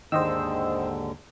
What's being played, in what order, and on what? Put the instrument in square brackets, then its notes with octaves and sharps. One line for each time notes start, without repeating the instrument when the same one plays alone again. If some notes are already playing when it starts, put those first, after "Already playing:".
[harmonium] D#2 G#2 D3 [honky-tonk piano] D#3 [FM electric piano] C5 D#5 E6